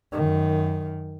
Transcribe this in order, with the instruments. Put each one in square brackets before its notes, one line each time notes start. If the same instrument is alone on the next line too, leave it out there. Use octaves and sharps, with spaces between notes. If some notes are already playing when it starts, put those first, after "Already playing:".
[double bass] F#2 D#3